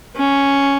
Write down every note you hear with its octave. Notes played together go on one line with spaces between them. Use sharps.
C#4